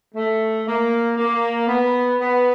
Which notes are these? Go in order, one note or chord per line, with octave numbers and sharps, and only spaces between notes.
A3
A#3
A#3
B3
B3